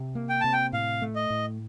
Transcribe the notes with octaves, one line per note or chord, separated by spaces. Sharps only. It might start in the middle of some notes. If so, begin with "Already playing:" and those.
Already playing: C3
A#3
G5
C3 A5
G5
A2 F5
A3
D#5
A2